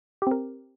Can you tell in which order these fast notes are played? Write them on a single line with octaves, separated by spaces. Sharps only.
G4 C4 A#4